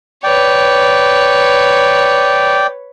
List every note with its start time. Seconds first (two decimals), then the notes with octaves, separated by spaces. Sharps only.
0.24 B4 C#5 D5 G5